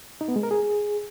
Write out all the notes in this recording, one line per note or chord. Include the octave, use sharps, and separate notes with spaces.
D#4
B3
G#3
A#4
G#4